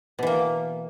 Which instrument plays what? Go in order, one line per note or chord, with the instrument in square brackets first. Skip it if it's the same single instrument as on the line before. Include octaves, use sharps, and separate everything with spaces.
[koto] B2
E3
A#3